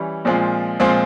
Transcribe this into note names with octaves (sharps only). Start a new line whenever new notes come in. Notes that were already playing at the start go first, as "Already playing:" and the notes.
Already playing: E3 G3 C#4
A#2 F3 G#3 C4 F4
A#2 F3 G#3 C4 F4